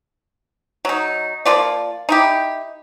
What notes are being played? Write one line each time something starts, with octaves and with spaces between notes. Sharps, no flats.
F#3 D#4
F3 A#3 F4 D5
D#4 E4 G4